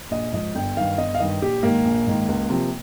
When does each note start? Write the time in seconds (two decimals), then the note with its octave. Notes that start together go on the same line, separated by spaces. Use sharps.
0.11 A#1 D#5
0.33 G#2 F3 D#5
0.55 G1 G5
0.77 G2 D#3 F5
0.98 G1 D#5
1.15 F5
1.20 G2 D#3 D#5
1.42 A#1 G4
1.63 G#2 D#3 A#3
1.85 A#1
2.07 G#2 D#3
2.28 C#2
2.50 C3 F3